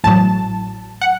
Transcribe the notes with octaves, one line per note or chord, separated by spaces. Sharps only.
A1 A2 F#3 A5
F#5